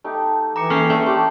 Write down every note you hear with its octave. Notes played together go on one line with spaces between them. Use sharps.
A3 D#4 G4
E3 A#5 D6 C#7
A#3 C#4 A4 G5 C7
A3 D4 E5 F#5
G4 A4 G5 C6